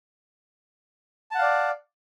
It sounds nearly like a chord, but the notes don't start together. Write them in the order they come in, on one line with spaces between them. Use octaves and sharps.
A5 F#5 F5 D5